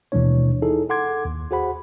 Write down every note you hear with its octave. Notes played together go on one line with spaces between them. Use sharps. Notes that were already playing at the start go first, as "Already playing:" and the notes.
D#2 B2 E3 G#3 D4 C#5
D#4 E4 G#4 A4
A4 F#5 C6 D6 G#6
D#2
F#4 G#4 C5 F#5 B5